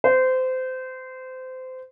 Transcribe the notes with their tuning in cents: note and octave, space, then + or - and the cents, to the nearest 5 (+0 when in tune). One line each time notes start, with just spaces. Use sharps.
C5 -25